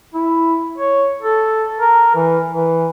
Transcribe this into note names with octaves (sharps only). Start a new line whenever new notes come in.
E4
C#5
A4
A#4
E3
E3